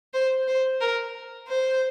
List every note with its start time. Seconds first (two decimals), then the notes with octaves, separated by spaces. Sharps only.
0.14 C5
0.48 C5
0.81 A#4
1.48 C5